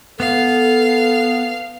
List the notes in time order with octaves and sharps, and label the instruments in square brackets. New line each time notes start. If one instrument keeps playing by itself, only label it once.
[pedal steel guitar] B3 [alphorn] A4 [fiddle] F5